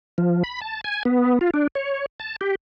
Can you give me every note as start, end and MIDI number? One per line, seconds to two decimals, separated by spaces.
0.18 0.43 53
0.44 0.61 83
0.61 0.81 81
0.84 1.03 80
1.05 1.39 59
1.41 1.50 65
1.54 1.67 62
1.75 2.06 73
2.20 2.36 81
2.41 2.55 67